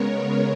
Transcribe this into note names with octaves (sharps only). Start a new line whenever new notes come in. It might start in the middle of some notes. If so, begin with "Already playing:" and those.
Already playing: C#3 G#3 B3 A#4 C#5